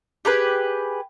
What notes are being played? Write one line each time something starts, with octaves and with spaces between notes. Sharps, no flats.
G4 G#4 B4